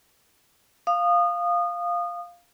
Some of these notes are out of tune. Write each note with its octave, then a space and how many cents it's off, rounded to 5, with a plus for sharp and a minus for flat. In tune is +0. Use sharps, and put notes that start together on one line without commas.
F5 +0 D#6 -25